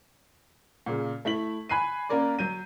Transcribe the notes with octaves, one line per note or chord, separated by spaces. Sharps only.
A#2 C#3
A3 E4 B6 F#7
G#5 B5 F#6 C7 D#7
A#3 C#4 A#4 D5
F#3 G6 D#7